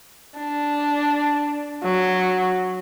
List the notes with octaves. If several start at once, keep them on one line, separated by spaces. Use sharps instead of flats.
D4
F#3